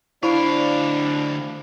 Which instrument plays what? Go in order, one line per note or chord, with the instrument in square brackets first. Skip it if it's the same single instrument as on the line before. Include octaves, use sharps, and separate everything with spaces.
[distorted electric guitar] D2 F5 [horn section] D4 [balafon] E4 [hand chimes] C5 D5 B5